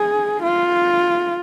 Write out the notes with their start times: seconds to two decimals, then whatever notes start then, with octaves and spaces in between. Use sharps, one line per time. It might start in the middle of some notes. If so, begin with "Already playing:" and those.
Already playing: G#4
0.44 F4